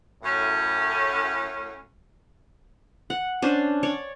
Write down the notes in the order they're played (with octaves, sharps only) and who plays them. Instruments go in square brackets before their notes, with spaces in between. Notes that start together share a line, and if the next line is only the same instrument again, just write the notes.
[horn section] F#2 A2 C#4
[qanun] F#5
C#4 D4 C5
C#5 D5